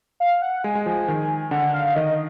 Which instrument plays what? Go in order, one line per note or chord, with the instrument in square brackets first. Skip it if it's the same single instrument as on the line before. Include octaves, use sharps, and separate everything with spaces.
[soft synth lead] F5
F#5
[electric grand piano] G#3 [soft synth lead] G#5
[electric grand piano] G#3
F3
D#3
[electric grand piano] D3 [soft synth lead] F#5
[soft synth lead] F5
[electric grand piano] D#3 [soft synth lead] D#5